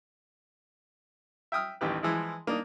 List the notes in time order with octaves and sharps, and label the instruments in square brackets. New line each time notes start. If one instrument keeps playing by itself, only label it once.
[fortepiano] E5 G5 D#6 F6
A1 D#2 G4 B4
E3 F3 G#3 E4
A#3 D4 D#4